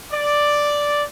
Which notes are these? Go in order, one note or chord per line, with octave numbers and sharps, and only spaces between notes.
D5